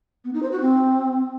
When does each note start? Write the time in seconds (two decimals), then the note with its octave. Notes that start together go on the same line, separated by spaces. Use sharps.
0.25 B3
0.34 D#4
0.43 C5
0.52 F#4
0.61 C4